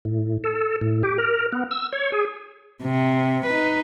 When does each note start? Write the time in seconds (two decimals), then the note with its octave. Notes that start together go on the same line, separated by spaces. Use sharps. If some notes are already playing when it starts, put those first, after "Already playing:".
0.05 A2
0.44 A4
0.81 A2
1.03 G4
1.18 A#4
1.52 B3
1.71 E6
1.93 C#5
2.12 G#4
2.83 C3
3.46 D#4 B4